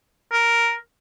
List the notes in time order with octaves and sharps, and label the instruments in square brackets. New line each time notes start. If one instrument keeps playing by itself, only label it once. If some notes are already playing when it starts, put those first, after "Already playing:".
[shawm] A#4